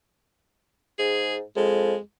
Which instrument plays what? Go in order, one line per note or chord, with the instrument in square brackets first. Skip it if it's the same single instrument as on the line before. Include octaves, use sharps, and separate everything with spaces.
[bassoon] G#2 [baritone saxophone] G#4
[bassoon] F2 [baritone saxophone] G#3